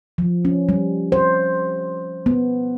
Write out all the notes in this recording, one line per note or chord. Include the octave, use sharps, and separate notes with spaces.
F3
C#4
G3
C5
B3